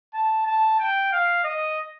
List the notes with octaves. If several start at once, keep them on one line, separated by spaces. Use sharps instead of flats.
A5
A5
G5
F5
D#5